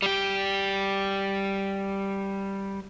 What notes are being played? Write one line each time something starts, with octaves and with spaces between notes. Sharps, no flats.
G3 G4